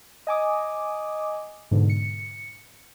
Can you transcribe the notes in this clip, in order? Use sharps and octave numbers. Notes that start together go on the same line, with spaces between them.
D#5 G#5 D6 D#6
G#2 B2 D3
C#7